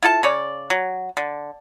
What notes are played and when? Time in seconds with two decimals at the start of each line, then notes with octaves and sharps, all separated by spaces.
0.03 E4 F4 A4 A5
0.23 C#3 C#5 D5
0.70 F#3
1.17 D3